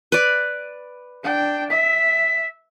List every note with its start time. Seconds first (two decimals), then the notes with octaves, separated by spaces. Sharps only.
0.12 B4 D5
1.23 D4 G5
1.70 E5 B6